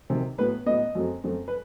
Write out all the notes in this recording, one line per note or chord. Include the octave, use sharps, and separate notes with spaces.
C3 D#3 F#3
A2 F#3 B3 B4
A2 F#3 B3 D#5
F#2 F#3 A3 C4
F#2 F#3 A3 C4
B4